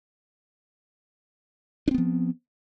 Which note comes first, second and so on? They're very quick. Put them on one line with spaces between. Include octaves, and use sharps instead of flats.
D4 C4 B3 F3